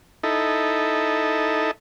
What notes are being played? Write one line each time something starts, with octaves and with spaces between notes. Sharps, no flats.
D#4 E4 A4